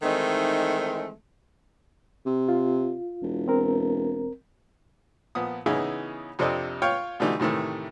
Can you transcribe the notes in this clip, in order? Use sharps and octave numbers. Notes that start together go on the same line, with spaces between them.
D#3 E3 G#3 A3 C4 D#4
C3
F4
E1
C4 A#4
A#2 F3 B3 D#6
C#3 E3 B3 D#4 E4 G#4
F2 C3 C4 D4 A4 D#5
F4 C#5 F5 G5 C#6
B2 D3 E3 G3 A3 D#4
A2 C3 D#3 E3 A3